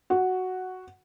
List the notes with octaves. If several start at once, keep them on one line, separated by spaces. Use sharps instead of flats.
F#4